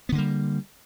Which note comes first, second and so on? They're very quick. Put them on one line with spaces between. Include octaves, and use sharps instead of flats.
B3 D3 A#3 G3